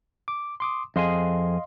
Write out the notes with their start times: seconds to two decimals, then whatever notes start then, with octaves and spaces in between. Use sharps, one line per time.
0.28 D6
0.60 C6 D6 D#6
0.96 F2 G#4 D#5 F5 C6